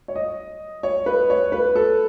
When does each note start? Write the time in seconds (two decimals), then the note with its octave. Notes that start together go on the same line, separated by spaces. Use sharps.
0.08 C#5
0.15 D#5
0.83 C#5
1.06 B4
1.30 C#5
1.52 B4
1.75 A4